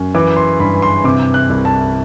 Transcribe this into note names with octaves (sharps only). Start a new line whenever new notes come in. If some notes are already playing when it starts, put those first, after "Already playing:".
Already playing: F#2
E3 D6
C6
G2 B5
C6
C3 D6
F#6
C2
A5